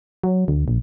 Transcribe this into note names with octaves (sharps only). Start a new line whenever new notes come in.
F#3
D2
A#1